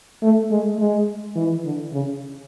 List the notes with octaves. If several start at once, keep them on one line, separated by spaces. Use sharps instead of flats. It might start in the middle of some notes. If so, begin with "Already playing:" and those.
A3
G#3
G#3
E3
D3
C#3